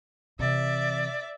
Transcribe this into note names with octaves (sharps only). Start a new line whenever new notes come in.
C3 E3 D5 E5